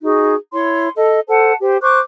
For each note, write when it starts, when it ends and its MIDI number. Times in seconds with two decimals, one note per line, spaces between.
0.02 0.34 63
0.02 0.34 66
0.02 0.34 68
0.53 0.89 64
0.53 0.89 73
0.53 0.89 84
0.96 1.19 69
0.96 1.19 75
1.29 1.53 69
1.29 1.53 72
1.29 1.53 78
1.29 1.53 81
1.61 1.77 67
1.61 1.77 72
1.82 1.99 72
1.82 1.99 85
1.82 1.99 86
1.82 1.99 90